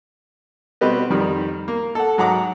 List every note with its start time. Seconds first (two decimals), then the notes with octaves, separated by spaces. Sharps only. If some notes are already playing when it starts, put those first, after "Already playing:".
0.81 B2 G3 C4 G4 B4 D#5
1.10 F2 D#3 G3
1.68 A#3
1.95 A4 F#5
2.18 G#2 F#3 F#5 A#5 D6